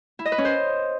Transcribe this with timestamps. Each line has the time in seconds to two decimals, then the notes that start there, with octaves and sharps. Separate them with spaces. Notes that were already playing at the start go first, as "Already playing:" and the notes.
0.19 E4
0.25 D#5
0.32 B4
0.38 C#4
0.45 C5